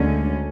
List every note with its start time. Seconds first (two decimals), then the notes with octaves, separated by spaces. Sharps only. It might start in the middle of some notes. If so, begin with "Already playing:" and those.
Already playing: D2 D3 G#3 C#4